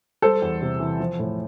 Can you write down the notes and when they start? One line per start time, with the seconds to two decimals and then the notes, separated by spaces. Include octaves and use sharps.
0.22 G3 A4 C5
0.42 E2
0.62 C3
0.80 E3
1.00 F3
1.19 A2